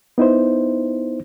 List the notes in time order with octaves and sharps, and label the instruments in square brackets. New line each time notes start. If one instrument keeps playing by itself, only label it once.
[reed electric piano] B3 D#4 E4 C5